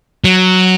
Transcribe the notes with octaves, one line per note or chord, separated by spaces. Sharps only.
F#3